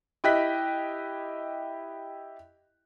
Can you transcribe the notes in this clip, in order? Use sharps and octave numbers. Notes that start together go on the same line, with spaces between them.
E4 G4 D#5 F#6 B6